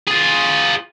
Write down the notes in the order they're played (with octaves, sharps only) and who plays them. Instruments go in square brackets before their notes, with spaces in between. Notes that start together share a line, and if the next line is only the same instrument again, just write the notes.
[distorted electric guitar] F4 G#4